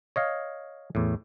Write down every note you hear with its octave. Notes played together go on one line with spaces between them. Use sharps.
C#5 D#5 F5
E2 A2